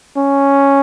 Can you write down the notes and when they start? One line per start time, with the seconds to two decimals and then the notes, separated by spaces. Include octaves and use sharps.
0.17 C#4